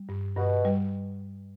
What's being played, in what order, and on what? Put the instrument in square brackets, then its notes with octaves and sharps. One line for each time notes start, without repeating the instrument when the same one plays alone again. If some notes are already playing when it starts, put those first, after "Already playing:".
Already playing: [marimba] G3
G2
[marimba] G2 [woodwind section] B2
[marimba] G3